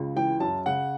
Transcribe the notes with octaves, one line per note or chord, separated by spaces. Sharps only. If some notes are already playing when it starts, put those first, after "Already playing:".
Already playing: C#2 C#3
E3 G5
F#2 A5
C#3 F#5